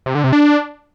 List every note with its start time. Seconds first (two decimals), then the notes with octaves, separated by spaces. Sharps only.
0.06 C3
0.15 D3
0.24 C3
0.33 D4